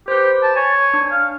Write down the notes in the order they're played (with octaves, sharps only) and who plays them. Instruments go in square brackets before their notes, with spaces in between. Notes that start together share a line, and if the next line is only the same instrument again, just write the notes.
[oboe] G4 [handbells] B4 C5
[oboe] A5
[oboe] C#5 [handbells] G#5
[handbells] D4
[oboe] F5